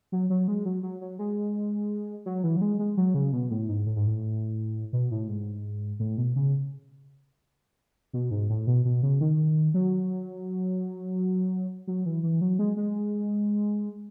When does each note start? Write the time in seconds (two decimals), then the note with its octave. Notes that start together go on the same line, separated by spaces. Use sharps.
0.12 F#3
0.30 F#3
0.48 G#3
0.65 F#3
0.83 F#3
1.01 F#3
1.19 G#3
2.26 F#3
2.44 E3
2.56 F#3
2.61 G#3
2.79 G#3
2.97 F#3
3.14 C#3
3.33 B2
3.50 A2
3.68 G#2
3.86 A2
3.96 G#2
4.07 A2
4.93 B2
5.11 A2
5.28 G#2
5.99 A2
6.18 B2
6.36 C#3
8.13 B2
8.31 G#2
8.50 A2
8.67 B2
8.85 B2
9.03 C#3
9.21 D#3
9.74 F#3
11.87 F#3
12.06 E3
12.23 E3
12.41 F#3
12.59 G#3
12.77 G#3